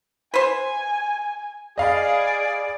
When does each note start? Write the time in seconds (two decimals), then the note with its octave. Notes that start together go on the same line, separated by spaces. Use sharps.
0.34 B4 C5 G#5
1.78 G#4 D5 D#5 F5 B5